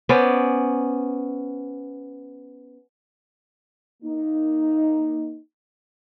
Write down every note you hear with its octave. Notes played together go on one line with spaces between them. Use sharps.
B3 C#4 C5 D5
A#3 D#4